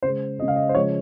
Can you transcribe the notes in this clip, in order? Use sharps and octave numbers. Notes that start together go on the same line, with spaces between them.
C#3 G#3 C5
C#3 G#3 D#5
F5
D#5
C5
C#3 F3 G#3 C#5